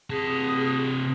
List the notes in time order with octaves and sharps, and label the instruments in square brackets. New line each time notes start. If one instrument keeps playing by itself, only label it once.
[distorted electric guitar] C3 A5 [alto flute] G#4